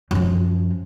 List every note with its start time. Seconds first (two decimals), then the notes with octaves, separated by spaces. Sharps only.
0.11 F#2 F3